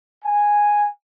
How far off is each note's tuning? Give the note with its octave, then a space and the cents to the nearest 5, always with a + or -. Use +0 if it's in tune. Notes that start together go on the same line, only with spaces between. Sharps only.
G#5 -5